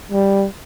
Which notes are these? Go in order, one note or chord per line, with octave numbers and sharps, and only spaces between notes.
G3